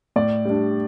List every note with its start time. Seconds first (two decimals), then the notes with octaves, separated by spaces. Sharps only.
0.16 A2 D5
0.45 G3 D4